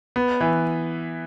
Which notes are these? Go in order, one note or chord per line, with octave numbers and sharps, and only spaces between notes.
B3
E3